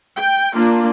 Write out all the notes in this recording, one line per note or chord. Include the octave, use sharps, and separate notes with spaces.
G5
A#3 D4 F4